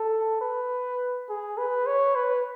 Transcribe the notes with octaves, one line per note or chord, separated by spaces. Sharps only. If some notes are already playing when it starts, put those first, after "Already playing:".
Already playing: A4
B4
G#4
B4
C#5
B4